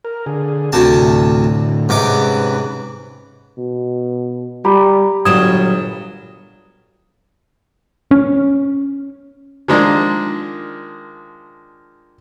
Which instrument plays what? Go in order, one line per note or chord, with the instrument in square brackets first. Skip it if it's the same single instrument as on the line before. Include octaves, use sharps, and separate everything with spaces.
[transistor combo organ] A#4
D3 G#4
[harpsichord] D2 C3 A5
[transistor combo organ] A2 D3
[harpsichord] G#2 C3 D6 [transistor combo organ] C#4 B4
[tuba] B2
[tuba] G3 [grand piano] G4 [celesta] A#5 B5
[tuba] G1 [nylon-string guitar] A#2 F#3 G3 [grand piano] D#6 [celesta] G#6 E7
[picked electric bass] C#4
[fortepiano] D#3 F3 G#3 A#3 D4